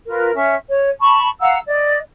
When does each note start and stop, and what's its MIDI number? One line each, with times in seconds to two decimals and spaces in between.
0.07 0.31 65
0.07 0.31 70
0.07 0.31 71
0.33 0.55 61
0.33 0.55 76
0.69 0.90 73
1.00 1.29 81
1.00 1.29 83
1.00 1.29 85
1.40 1.57 77
1.40 1.57 78
1.40 1.57 82
1.40 1.57 88
1.67 1.97 74
1.67 1.97 75